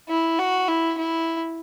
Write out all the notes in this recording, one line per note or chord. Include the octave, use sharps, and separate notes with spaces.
E4
F#4
E4
E4